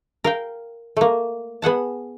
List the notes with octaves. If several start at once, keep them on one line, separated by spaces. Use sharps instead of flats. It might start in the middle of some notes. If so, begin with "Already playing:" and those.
A#4 F5 G5
A3 A#3
B3 G#4 F#5 A5